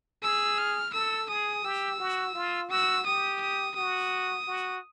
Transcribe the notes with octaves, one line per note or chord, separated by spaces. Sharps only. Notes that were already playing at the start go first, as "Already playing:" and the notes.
G#4 E6
F6
A4 E6
G#4 D#6
G4 E6
F#4
F4
F#4 E6
G4 D#6
D#6
F#4 D#6
F#4